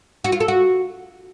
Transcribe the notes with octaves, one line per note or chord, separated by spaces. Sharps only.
F#4
F4
A4
F#4